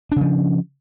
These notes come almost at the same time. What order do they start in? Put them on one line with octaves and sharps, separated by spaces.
D4 C#3 F3